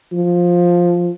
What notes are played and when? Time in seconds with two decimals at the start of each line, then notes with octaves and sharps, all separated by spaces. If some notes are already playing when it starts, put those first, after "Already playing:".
0.12 F3